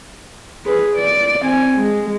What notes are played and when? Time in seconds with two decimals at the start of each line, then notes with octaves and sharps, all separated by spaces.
0.66 G#4 B4
0.96 D5
1.40 C4 G#5
1.76 G#3